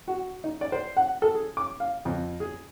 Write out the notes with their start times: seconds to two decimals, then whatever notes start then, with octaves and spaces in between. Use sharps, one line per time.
0.08 F#4
0.44 D#4
0.61 D5
0.72 C5
0.97 F#5
1.22 A4
1.35 G#4
1.57 D6
1.80 F5
2.05 F2
2.40 G#4